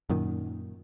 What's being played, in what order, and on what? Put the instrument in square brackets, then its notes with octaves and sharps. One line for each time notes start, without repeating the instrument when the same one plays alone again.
[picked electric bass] F#2 A#2 D#3